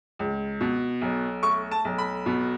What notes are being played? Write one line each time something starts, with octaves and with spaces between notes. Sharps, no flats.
C#2
B2
B1
A3 C#6
A5
B1
B5
B2